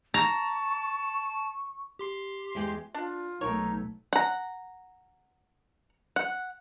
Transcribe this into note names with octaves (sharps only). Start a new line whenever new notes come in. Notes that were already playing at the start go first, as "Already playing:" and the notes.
A5 A#5 C#6
G4 C6 C7
E2 G#3 G5
D4 F4
B1 A3 D#4 A#4 C#5
F#5 A#5
F#5